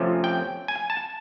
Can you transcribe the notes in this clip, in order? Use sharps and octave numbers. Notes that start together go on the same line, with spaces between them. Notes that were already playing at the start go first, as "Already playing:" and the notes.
Already playing: F2 C3 F3 A3 C#4
G5
G#5
A5